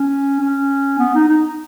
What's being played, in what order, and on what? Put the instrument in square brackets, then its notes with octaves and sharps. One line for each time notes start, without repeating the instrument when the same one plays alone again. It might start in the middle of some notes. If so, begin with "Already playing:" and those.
Already playing: [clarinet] C#4
C#4
B3
D#4
D#4